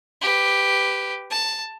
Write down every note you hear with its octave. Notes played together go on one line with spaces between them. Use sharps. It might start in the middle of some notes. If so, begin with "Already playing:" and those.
G4 B4
A5